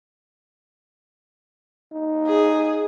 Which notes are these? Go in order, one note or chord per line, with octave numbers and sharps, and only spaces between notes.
D#4
G#4